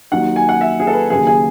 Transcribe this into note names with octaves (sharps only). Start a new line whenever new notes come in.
D#2 D#3 F#3 F#5
G#5
F#5
E5
G#4
A4
B4
D#2 C#3 F#3 G#4
G#4